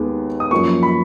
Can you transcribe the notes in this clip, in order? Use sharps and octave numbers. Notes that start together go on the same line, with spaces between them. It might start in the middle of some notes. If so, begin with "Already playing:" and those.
Already playing: D#2 D#3 G#3 B3
D#6
F#2 F3 A#3 C#6
B5